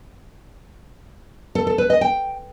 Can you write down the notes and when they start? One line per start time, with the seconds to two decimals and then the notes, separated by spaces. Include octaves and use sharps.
1.55 A4
1.67 A4
1.78 B4
1.90 D#5
2.01 G5